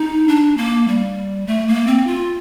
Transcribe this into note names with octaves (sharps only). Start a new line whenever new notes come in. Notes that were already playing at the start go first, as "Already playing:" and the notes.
Already playing: D#4
D4
A#3
G3
A3
A#3
C4
F4